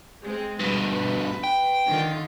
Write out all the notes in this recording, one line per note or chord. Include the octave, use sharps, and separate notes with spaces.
G#3 C4
G2 B2 B4
B4
G5
D3 D#3 F4